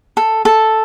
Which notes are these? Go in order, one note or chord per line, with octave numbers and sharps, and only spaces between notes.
A4
A4